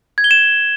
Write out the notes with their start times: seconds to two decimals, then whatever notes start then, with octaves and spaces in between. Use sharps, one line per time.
0.18 G#6
0.24 G7
0.31 E7